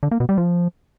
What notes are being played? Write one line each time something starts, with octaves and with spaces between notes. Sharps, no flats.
D3
A#3
B2
G3
F3